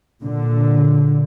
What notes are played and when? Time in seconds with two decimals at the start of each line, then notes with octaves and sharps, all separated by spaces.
0.22 A#2 D3